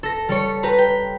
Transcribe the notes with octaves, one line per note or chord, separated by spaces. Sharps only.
A4 A#6
G3 A4 C#5
G4 B4 A#5 B5
G5